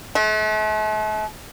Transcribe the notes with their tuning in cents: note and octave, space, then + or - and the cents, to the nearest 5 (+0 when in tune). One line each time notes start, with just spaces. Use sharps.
A3 -45